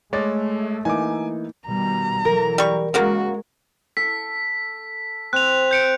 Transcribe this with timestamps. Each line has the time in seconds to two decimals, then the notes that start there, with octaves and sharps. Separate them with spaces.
0.13 G#3 A3 C#5 D6 A6
0.85 E3 A#3 D#4 G#5 D6
1.67 B2 D#3 G3 A#5
2.25 E3 F#3 A#4
2.58 G3 C#6
2.94 C#3 F#3 G#3 A#3 F#4
3.97 A4 B6
5.33 C4 F#6 F7
5.71 G6 C#7 D7